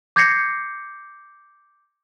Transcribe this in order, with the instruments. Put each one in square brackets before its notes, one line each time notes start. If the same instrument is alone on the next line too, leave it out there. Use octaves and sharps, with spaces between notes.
[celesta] D6 G6 G#6 A#6 C7 C#7